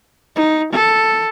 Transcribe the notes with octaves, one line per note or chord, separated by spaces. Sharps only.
D#4
A4